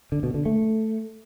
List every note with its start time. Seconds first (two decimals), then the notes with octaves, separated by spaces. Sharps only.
0.12 D3
0.23 B2
0.34 D3
0.46 A3